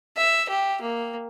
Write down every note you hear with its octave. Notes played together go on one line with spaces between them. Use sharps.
E5
G4
A#3